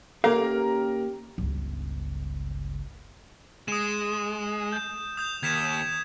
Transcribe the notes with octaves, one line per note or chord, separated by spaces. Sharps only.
D#2 A#3 C#4 G4 A4 A#4 F5
G1 C#2
G#3 D#6 E7
G6
D#6 G6 F7
D#2 G#6 B6 E7